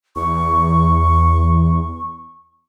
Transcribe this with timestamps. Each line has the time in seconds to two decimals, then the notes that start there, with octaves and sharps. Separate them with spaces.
0.16 E2 C#6